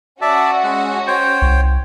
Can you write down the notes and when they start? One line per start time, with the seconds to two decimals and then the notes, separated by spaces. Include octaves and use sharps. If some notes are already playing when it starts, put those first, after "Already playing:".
0.21 C#4 F#4 D5 E5 A5
0.64 G#3 F#5
1.07 C5 C#5 G5
1.42 C2